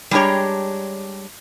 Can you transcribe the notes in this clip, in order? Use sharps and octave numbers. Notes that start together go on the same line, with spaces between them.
G3 G#3 D4 G4 C#5 A#5